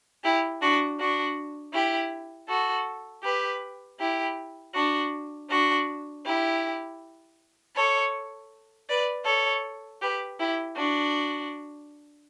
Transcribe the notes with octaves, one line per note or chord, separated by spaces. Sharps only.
E4 G4
D4 F#4
D4 F#4
E4 G4
F#4 A4
G4 B4
E4 G4
D4 F#4
D4 F#4
E4 G4
A4 C#5
B4 D5
A4 C#5
G4 B4
E4 G4
D4 F#4